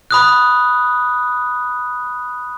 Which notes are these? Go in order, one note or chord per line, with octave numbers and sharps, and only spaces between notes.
B5 D#6 F#6